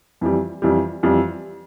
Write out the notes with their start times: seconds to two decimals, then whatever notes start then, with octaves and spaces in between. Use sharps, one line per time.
0.21 F2 E3 G3
0.62 F2 E3 G3
1.03 F2 E3 G3